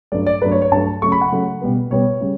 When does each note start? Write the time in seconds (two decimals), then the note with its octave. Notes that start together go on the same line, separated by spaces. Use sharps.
0.12 G2 F#3 A3 D5
0.27 D5
0.41 A3 B4
0.44 G2 F#3
0.52 C#5
0.62 C#5
0.72 G2 F#3 A3 A5
1.02 C#3 F#3 A3 C#6
1.12 B5
1.21 F#5
1.32 C#3 F#3 A3
1.61 B2 G3 B3
1.90 B2 G3 B3 C#5
2.21 C#3 G3